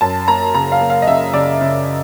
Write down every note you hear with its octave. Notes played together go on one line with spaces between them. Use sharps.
F#2 A5
A#3 A#5
C#3 A#5
F5
A#3
F5
D#5
C#3 E5
C#3 D5
C#3